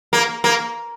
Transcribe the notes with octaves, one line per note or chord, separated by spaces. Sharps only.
A#3
A#3